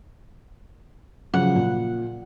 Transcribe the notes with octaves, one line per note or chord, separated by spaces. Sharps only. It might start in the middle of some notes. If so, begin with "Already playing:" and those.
C#3 F3 F#3 F#5
A#2